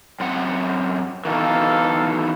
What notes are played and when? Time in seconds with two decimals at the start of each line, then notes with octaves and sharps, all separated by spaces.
0.20 F#2 C4 F#5
1.25 B2 D#3 E3 A4 A#4 F5